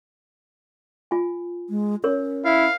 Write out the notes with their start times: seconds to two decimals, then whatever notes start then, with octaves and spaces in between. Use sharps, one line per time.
1.11 F4 G#5
1.70 G#3
2.04 C#4 A#4 C#5
2.45 E4 F5